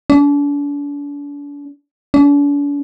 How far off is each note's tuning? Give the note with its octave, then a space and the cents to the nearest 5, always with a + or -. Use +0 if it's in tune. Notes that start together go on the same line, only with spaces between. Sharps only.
D4 -40
D4 -45